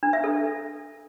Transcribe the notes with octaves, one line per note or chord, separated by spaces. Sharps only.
D4
E5
A4